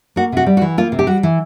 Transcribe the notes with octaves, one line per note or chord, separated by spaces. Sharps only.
A#3 F#4
C3 F#4
G3
F#4
E3
A#3 F4
C3
G4
G3 F#4
E3